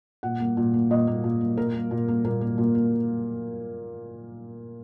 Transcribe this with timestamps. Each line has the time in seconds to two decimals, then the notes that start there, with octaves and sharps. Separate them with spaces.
0.23 A#2 F#5
0.40 A#3
0.57 A#2
0.73 A#3
0.90 A#2 D#5
1.07 A#3
1.24 A#2
1.41 A#3
1.57 A#2 A#4
1.74 A#3
1.91 A#2
2.08 A#3
2.25 A#2 A#4
2.41 A#3
2.58 A#2
2.75 A#3